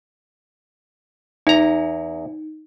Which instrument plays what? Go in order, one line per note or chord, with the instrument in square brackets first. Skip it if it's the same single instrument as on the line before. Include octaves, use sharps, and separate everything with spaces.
[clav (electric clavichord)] E2 A#5 [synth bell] D#4